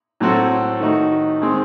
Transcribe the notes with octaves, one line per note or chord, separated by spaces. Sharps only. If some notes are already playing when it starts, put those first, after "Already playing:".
A2 F#3 C4 F#4 A4
D#3 A3 D#4 F#4
D#3 G#3 C4